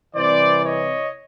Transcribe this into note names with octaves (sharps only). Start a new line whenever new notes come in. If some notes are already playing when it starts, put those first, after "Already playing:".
C2 C3 E3 C5 D5
C#5 D#5